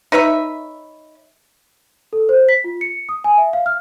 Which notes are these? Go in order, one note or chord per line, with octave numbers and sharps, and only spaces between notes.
D#4 B4 C#5 E5
A4
C5
B6
F4
C#7
D#6
G#5
E5
F5
F6